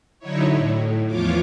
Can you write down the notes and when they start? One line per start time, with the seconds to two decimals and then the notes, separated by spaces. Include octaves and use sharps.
0.19 D3 F#3 D#4 E4 C#5
0.51 A2
1.06 E2 E3 F3 F4 C#5 D6